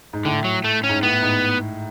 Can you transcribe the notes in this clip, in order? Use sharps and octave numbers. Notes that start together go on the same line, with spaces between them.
G#2
A2 D3
F#3
A3
C#4
G#2
A2 B3
G#2